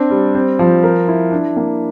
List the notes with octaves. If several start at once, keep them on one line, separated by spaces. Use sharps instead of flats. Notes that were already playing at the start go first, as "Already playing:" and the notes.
Already playing: C4 D4
G3
C4
F3
A#4
E4
D4
A#3